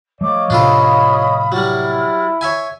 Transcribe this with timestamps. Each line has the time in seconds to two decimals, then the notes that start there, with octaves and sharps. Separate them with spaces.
0.21 F3 G3 A3 C#5 D#5 F5 D6
0.50 A2 C3 F3 D4 F4 A4 B5 D#6
1.52 F#3 G3 E4 D5 F6
2.41 C#5 E5 G#5